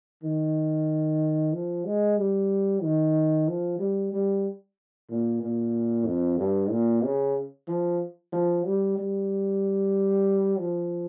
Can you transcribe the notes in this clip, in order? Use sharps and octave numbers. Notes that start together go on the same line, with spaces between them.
D#3
F3
G#3
G3
D#3
F3
G3
G3
A#2
A#2
F2
G2
A#2
C#3
F3
F3
G3
G3
F3